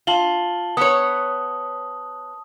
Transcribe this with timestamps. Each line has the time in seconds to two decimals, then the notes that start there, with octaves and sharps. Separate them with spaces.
0.07 F4 A5 F#7 G7
0.77 B3 C#5 D#6